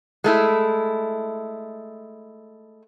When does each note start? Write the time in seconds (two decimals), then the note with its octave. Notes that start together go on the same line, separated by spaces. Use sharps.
0.24 G#3 A3 E4